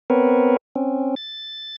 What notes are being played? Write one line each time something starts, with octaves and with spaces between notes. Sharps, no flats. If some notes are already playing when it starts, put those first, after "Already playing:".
B3 C4 A#4 B4 C#5
C4 C#4
A6